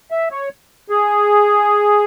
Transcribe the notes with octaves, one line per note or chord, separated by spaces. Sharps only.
E5
C#5
G#4